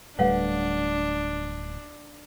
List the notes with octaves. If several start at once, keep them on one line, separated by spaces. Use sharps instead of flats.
D1 G3 A3 D4 B4 C#5 F5 F#5